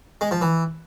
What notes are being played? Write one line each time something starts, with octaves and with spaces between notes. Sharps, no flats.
G#3
F3
E3